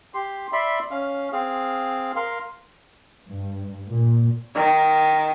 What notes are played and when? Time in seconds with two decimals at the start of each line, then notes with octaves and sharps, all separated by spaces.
0.14 G4 C6
0.53 D5 E5 B5 C6
0.91 C#4 F5
1.32 C4 G#4 F5
2.16 A#4 F5 C6
3.29 G2
3.88 A#2
4.55 D#3